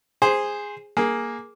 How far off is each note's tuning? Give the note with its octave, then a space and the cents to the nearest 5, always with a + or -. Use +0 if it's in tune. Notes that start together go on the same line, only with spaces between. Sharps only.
G#4 -10 C5 +0
A#3 +5 G#4 +0